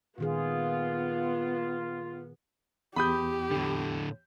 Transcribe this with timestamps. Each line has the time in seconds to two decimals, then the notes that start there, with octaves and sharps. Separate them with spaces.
0.18 A#2 D#3 B3 F4 G#4
2.96 E2 G4 B5 D#6 G6
3.50 A2 D3